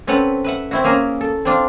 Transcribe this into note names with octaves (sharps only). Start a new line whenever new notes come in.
C4 C#4 A4 B4 F#5
B4 E5 F#5
C4 E4 F#4
A#3 C#4 G#4 A#4
A4
C4 D4 F4